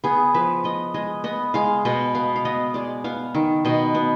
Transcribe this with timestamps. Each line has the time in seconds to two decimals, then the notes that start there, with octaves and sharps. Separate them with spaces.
0.04 B3 G#4
0.34 F3 B4
0.64 B3 D#5
0.94 G#3 D#5
1.24 B3 D#5
1.54 G#3 F5
1.85 B2 D#5
2.15 B3 F5
2.36 F5
2.45 B3 D#5
2.74 G#3 D5
3.04 B3 F5
3.35 D#3
3.65 B2 D#5
3.95 B3